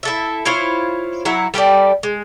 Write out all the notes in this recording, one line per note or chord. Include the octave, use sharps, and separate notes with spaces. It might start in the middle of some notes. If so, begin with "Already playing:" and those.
E4 A4 E5
E4 F4 C5 C#5
F#3 E4 F#5
G3 G4 A4 D5
G#3